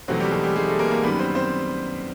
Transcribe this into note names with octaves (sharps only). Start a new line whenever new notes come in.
E2 B2 F#3 A3 C4 F#4
G3 G4
G#3 G#4
G3 G4
G#3 G#4
A3 A4
A#3 A#4
A#3 A#4
F#2 D#3 G3 B3 B4
C4 C5
C4 C5